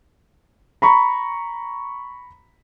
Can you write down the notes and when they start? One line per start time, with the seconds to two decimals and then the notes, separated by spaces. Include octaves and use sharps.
0.82 A#5 B5 C#6